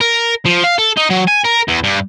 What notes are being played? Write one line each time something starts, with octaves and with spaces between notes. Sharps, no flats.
A#4
F3
F5
A4
D#4
F#3
G#5
A#4
E2
G2